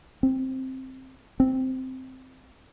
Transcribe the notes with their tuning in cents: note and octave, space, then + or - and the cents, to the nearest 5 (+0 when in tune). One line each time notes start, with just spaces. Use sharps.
C4 +5
C4 -5